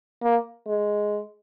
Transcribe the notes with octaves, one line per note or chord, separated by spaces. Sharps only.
A#3
G#3